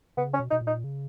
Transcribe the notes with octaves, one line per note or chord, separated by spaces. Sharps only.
C#3 B3
C#4
B2
B2 D#4
A#2
D#4
C#3